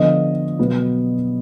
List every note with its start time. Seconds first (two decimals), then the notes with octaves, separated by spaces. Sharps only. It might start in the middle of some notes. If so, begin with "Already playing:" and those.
Already playing: D3 F3 B3 D#5
0.59 B2 F#3 B3